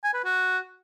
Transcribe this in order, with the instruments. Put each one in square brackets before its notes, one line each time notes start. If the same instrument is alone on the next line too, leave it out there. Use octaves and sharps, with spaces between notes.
[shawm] G#5
B4
F#4